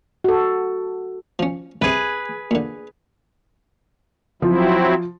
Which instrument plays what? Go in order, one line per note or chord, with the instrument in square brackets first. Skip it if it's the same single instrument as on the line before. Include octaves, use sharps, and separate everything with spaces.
[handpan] F#4 A4
[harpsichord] F3 C#4
[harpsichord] C2 C3 [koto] G#4 B4
[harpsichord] A#2 D3
[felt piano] F3 [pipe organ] F#3 C4 E4